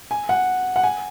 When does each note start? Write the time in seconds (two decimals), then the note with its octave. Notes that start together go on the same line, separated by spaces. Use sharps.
0.11 G#5
0.29 F#5
0.76 F#5
0.83 G#5